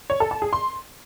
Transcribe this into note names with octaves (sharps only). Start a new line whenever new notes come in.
C#5
A4
A5
G#4
C6